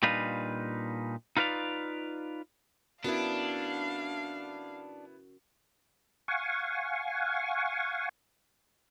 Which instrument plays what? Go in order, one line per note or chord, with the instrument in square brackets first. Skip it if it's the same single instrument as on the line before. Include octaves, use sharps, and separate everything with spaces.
[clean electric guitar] A#2 G3 D4 D#4 B4 F5
D#4 F4 B4 D5 F5
[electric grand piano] B3 E4 [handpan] C#4 F#4 A#4 [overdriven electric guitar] D4 [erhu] F5
[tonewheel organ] F5 F#5 G#5 C#6